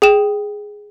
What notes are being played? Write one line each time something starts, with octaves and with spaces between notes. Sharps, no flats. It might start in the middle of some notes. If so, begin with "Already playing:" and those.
G#4 G5 E7